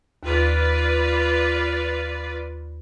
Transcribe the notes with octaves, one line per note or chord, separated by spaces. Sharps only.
D#2 F4 B4 D5